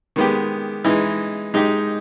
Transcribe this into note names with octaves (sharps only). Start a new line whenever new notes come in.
D#3 G#3 B3 G4
E3 G#3 D#4
G#3 D#4 G4